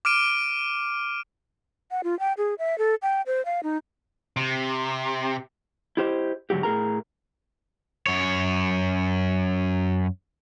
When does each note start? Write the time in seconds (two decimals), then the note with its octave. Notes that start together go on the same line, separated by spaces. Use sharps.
0.05 D6 F6 D7 D#7
1.91 F#5
2.04 F4
2.19 G5
2.38 G#4
2.59 E5
2.78 A4
3.02 G5
3.26 C5
3.45 F5
3.63 D#4
4.37 C3
5.97 E4 G4 C5 D#5
6.50 G#2 D3 E3 F#3 F#4 G4
6.63 A2 G#4 A#4 A#5
8.07 F#2 C#5